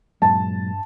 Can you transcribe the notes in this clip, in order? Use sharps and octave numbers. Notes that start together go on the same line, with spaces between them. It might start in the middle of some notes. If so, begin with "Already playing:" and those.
G2 A#2 F#3 G#3 A5